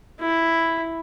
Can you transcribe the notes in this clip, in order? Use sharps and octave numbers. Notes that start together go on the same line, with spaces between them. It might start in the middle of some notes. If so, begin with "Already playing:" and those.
E4